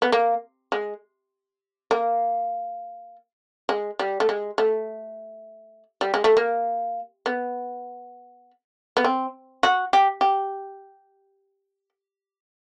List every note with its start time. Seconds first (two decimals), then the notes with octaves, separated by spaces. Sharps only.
0.02 B3
0.12 A#3
0.72 G#3
1.91 A#3
3.69 G#3
3.99 G3
4.20 A3
4.29 G#3
4.58 A3
6.01 G3
6.14 G#3
6.24 A3
6.37 A#3
7.26 B3
8.97 B3
9.04 C4
9.63 F#4
9.93 G4
10.21 G4